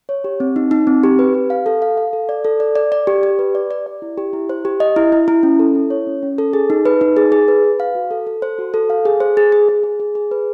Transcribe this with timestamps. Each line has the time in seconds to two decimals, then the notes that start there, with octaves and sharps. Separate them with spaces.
0.09 C#5
0.24 G4
0.40 C4
0.56 D#4
0.71 D#4
0.87 C4
1.03 G4
1.19 B4
1.34 G4
1.50 F5
1.66 A4
1.82 F5
1.97 F5
2.13 A4
2.29 D5
2.45 A4
2.60 D5
2.75 D5
2.92 D5
3.07 G4
3.23 G4
3.39 B4
3.55 D5
3.71 D5
3.86 D5
4.02 E4
4.18 G4
4.33 E4
4.49 C5
4.65 G4
4.80 D#5
4.96 E4
5.12 E4
5.28 E4
5.43 C#4
5.59 A4
5.75 E4
5.90 C#5
6.07 C#4
6.23 C#4
6.38 A4
6.53 G#4
6.70 D#4
6.86 B4
7.01 D#4
7.17 G#4
7.32 G#4
7.48 B4
7.64 B4
7.80 F5
7.95 F#4
8.11 A4
8.27 A4
8.42 C5
8.59 F#4
8.74 A4
8.90 F5
9.05 G#4
9.20 C5
9.37 G#4
9.52 G#4
9.69 G#4
9.84 G#4
10.00 G#4
10.15 G#4
10.31 B4